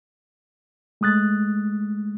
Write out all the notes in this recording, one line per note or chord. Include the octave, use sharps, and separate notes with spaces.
G#3 A3 D#6 F#6 A6